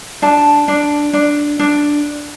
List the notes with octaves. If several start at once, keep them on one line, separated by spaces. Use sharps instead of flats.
D4 A5
D4
D4
D4